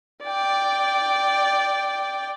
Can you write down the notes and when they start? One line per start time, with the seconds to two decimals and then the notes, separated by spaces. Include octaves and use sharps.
0.24 D5 G5